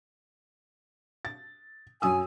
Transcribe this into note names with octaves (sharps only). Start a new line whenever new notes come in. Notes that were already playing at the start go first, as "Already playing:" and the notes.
A6
F#2 G#5 D#6 E6